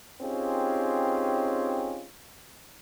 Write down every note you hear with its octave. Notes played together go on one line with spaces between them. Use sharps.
C4 C#4 D#4 F4 G4 G#4